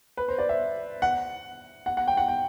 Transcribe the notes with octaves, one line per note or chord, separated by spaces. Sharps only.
B4
C5
D5
E5
F#5
F#5
F#5
G5
F#5
G5